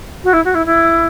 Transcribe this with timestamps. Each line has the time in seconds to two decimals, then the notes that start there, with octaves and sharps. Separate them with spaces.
0.23 F#4
0.33 E4
0.44 F#4
0.54 E4
0.65 E4